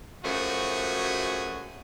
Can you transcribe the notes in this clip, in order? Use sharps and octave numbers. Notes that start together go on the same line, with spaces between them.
F#2 F3 A3 F#4 G#4